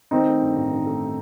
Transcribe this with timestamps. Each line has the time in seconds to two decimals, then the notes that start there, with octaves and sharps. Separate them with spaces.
0.11 D#3 C4 D#4
0.27 A3
0.42 G2
0.56 A1
0.71 D#3
0.86 A3